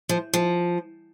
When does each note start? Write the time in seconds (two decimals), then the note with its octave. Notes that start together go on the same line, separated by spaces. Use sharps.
0.09 F3
0.33 F3